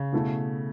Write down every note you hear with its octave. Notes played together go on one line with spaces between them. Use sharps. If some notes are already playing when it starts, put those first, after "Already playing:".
Already playing: C#3
B2 A3 E4